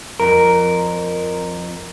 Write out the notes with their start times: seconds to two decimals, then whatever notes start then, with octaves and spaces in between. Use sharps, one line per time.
0.20 F2 F3 A#4